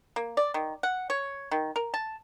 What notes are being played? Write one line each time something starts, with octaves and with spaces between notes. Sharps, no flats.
A#3
D5
D#3
F#5
C#5
D#3
A#4
A5